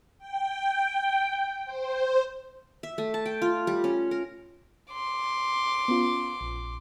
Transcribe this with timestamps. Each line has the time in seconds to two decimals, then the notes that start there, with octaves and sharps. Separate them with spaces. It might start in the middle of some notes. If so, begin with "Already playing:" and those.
0.19 G5
1.65 C5
2.83 E5
2.98 A3
3.14 A5
3.26 G5
3.42 F4
3.67 G3
3.84 C#4
4.11 A#4
4.93 C6 D6
5.88 B3 C#4 F4
6.41 A#1